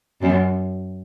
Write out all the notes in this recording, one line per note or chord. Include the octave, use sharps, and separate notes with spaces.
F#2